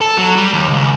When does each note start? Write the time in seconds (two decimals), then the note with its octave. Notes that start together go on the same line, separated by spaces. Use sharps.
0.01 A4
0.17 F#3
0.36 G3
0.53 D#2
0.69 C#2